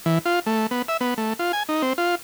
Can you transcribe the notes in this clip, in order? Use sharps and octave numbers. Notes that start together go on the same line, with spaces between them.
E3
F4
A3
B3
E5
B3
A3
F4
G#5
D#4
C4
F4